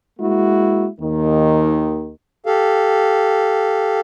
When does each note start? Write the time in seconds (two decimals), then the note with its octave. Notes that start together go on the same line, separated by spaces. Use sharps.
0.19 G#3 A#3 E4 F#4
1.00 D#2 D#3
2.46 G4 A4 F5